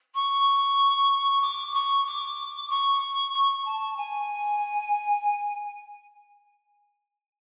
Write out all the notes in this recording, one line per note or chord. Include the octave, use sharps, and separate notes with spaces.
C#6
D6
C#6
D6
C#6
C#6
A5
G#5